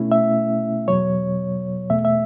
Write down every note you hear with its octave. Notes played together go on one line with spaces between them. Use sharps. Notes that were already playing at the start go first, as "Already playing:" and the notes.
Already playing: B2 A3 C#4 E4
E5
E2 B2 F#3 C#5
E2 B2 A3 E5
E5